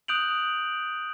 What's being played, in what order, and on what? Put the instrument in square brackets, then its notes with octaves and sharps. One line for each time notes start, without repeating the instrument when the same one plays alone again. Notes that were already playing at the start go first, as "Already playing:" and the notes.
[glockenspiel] D#6 F#6 G6 D7 F7 F#7